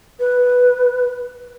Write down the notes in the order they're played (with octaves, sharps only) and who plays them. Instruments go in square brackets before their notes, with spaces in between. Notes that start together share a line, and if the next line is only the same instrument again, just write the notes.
[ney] B4